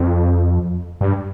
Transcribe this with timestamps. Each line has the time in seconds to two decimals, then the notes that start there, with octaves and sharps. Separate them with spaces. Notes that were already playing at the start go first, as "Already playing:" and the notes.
Already playing: F2
1.01 G2